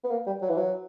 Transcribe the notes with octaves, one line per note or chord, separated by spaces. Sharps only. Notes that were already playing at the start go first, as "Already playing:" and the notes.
B3
A#3
G3
F#3
E3
F#3